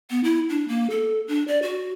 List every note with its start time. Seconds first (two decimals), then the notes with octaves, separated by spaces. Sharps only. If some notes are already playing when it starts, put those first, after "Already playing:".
0.10 B3
0.24 E4
0.49 D4
0.68 A#3
0.90 A4
1.28 D4
1.48 D5
1.63 F#4